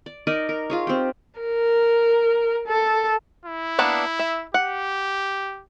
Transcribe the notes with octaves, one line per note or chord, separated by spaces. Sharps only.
D5
D#4 A#4 D5 D#5
A#4
F4 G#4 C#5
C4 G4
A#4
A4
E4
A#3 B3 D4
E5
G4 F#5